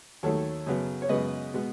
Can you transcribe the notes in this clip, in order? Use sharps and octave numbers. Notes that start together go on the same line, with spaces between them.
D#2 D#3 F#3 A3 A4 C#5
F#2 C#3 F#3 B3
C#5
F#2 C#3 G#3 B3 B4 D#5
B2 G#3 B3